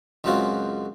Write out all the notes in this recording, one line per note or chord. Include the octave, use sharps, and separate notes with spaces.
C#2 F#2 G#3 C4 F4 F#4